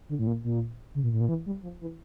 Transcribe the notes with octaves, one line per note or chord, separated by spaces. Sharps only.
D3
A2
A#2
A#2
C#3
A#2
A2
A#2
E3
G3
F3
E3